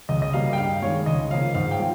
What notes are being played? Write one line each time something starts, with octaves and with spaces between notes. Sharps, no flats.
C#2 D#5
D#5
C#3 G3 A#3 F5
G5
G2 F5
D#3 G#3 C#5
C#2 D#5
C#3 F3 A#3 F5
G#2 F5
G5
F3 G#3